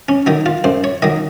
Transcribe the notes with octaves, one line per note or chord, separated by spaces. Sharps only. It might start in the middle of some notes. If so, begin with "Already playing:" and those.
C#4
D#3 F#3 D#4
F4
F#2 C5
C#5
D#3 F#3 D#5